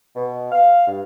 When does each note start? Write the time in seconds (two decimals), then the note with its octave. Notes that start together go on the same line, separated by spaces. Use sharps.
0.16 B2
0.52 F5
0.87 G2